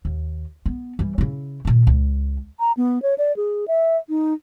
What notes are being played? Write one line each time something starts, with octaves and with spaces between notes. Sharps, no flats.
D#2
B3
E3 G3
C#3 E4
A#2 D#3
C#2
A#5
B3
C#5
D5
G#4
E5
D#4